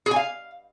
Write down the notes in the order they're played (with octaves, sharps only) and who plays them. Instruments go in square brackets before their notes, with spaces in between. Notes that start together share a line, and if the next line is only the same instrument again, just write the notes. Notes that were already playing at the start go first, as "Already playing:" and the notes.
[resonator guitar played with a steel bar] G#4
G#5
F5